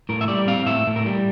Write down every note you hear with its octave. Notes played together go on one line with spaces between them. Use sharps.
A2 A#4
E5
G3 D5
C4 F5
A2 E5
A2
A#4
G3